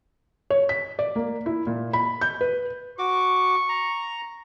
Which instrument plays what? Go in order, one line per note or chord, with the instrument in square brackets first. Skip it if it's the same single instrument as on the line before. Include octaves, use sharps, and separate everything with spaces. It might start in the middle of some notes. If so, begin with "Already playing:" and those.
[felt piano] C#5
B6
D5
A#3
E4
A#2
B5
G6
B4
[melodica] F#4 D6 [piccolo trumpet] C#6
[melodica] A#5